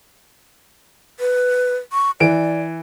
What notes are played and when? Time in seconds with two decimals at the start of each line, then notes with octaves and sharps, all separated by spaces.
1.20 B4
1.92 C#6
2.20 E3 D5 D7